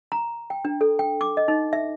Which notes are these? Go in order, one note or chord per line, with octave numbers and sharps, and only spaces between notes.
A#5
G5
D4
A4
G5
D6
D#5
D#4
E5